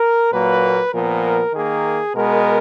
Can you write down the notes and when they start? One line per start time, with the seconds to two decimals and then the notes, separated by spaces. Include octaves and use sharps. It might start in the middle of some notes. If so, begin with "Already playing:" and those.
Already playing: A#4
0.32 A#2 F#3 A#3 B4
0.93 A#2 F3 B3 A#4
1.53 D#3 A#3 G#4
2.15 B2 G#3 B3 A#4